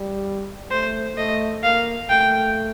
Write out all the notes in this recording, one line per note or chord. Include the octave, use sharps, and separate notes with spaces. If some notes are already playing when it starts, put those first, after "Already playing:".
Already playing: G3
A3 C5
A3 D#5
A#3 F5
A3 G5